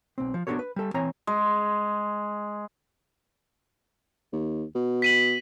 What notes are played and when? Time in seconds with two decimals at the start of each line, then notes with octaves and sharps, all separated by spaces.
0.18 B1 C4
0.34 F3
0.47 B3 D4 D#4 F#4 A4 C#5
0.59 B4
0.76 G3 A4
0.94 E3 C4 C#5 G#5 A#5
1.27 G#3
4.33 D#2
4.75 B2
5.02 B6 D#7 F#7